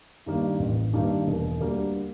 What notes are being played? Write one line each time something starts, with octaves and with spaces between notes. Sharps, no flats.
G2 D#3 G3 A#3
A1
G2 D#3 G3 A#3
E1
D2 D3 G3 A#3